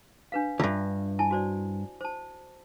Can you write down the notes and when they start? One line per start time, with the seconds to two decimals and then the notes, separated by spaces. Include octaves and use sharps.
0.32 D4 B4 F5
0.60 D2 G2 F4 E5
1.19 E4 G#5 A5
1.31 F#4 C5 D5
2.01 C5 A5